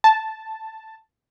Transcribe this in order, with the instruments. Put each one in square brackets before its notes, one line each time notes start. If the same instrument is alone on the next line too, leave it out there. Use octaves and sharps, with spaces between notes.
[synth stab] A5